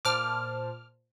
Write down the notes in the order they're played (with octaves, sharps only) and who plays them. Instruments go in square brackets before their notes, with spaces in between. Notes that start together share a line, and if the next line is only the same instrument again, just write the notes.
[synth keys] A#2 C5 A5 [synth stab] D6 F6